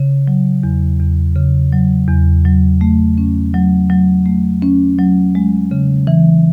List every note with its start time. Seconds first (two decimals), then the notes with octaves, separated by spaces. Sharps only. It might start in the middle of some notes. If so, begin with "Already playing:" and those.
Already playing: C#3
0.28 F#3
0.63 E2
1.00 E2
1.36 C#3
1.72 F#3
2.08 E2
2.45 F#3
2.81 A3
3.18 C#4
3.54 F#3
3.90 F#3
4.26 A3
4.62 C#4
4.99 F#3
5.35 G#3
5.71 C#3
6.07 E3